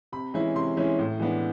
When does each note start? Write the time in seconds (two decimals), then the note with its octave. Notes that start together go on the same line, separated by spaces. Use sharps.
0.12 C3 B5
0.34 E3 G#3 C#4 E4
0.55 C3 C6
0.77 E3 G#3 C#4 E4
0.99 A2
1.20 E3 G#3 B3 D4